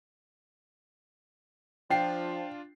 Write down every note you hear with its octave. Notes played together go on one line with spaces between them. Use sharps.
F3 D4 F4 G5 C7